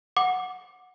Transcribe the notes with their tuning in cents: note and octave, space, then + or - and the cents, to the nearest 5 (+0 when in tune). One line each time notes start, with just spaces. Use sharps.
F#5 -10 D6 +0